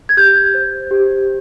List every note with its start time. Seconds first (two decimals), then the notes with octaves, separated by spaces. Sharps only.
0.09 G#6
0.17 G4 G6
0.54 C5
0.91 G4